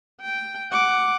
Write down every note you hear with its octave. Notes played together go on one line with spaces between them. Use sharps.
G5
F#5 D6